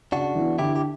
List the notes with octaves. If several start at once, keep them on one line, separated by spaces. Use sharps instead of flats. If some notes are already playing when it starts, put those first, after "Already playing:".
C#3 D4 F#4
E3 B3
D3 E4 G4
G4